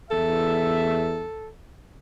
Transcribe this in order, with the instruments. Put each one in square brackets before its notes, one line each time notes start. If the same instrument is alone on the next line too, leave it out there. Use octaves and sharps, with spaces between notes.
[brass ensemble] E2 E5 [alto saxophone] A4